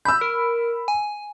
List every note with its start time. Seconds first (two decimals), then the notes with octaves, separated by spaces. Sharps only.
0.05 B5 E6 G6
0.21 A#4
0.88 G#5